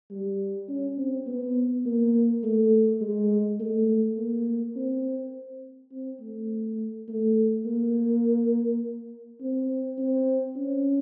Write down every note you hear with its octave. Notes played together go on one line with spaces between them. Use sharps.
G3
C#4
C4
B3
A#3
A3
G#3
A3
A#3
C4
C4
A3
A3
A#3
C4
C4
C#4